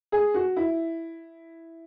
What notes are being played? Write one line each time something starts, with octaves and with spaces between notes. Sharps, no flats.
G#4
F#4
E4